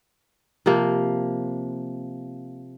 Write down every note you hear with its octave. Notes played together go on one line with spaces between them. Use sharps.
C3 F3 A#3